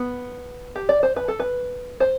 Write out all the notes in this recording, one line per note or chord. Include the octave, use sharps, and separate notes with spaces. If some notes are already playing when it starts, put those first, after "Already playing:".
Already playing: B3
G4
D5
C5
B4
A4
B4
C5